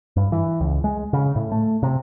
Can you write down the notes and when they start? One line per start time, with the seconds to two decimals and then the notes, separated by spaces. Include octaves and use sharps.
0.16 G2
0.32 E3
0.60 C#2
0.84 G#3
1.13 C#3
1.36 A2
1.52 A3
1.83 C3